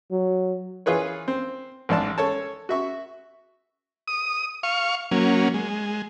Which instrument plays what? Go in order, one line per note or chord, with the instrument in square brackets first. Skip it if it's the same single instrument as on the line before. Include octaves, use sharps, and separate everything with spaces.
[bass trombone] F#3
[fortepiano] E3 F4 G#4 B4 C#5
C4
A1 G#2 D5 A5
A4 C#5 A5
F#4 E5 C#6
[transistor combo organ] D#6
F5 C#6
F#3 A#3 C#4
G#3